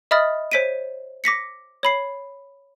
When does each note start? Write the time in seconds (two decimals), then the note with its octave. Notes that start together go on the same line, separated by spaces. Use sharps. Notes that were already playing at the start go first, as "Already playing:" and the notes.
0.11 D#5 E5 B5 D#6 F6 A6
0.52 C5 C#5 B6 D7 D#7
1.24 D6 A#6 B6 C#7
1.83 C#5 B5 C7